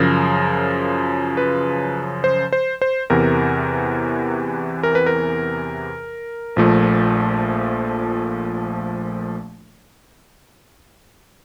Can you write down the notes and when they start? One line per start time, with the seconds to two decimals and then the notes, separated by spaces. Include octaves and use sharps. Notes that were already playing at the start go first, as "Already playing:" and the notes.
Already playing: F#2 C#3 F3 A#4
1.37 B4
2.24 C5
2.53 C5
2.82 C5
3.10 E2 C3 E3 A#4
4.83 A#4
4.95 B4
5.06 A#4
6.56 A#1 A#2 F3 A3